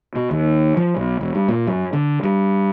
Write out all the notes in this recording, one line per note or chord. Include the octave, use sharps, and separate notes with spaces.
B2
D#2
F3
B1
E1
G2
A#2
F#2
D3
G2